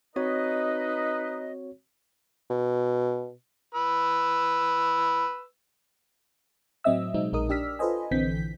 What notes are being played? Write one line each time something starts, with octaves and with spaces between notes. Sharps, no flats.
C4 D#4 F#4 B4 C#5 D#5
B2
B4 E6
A2 F#3 C4 D#5 E5 E6
B2 F#3 G#3 C4 D#4
A#1 G#3 D#4 A#4 D#6
D4 G4 D5 E6 F6 B6
F4 A4 B4 C5 D#5 G#5
A#1 D3 E3 C4 G6 B6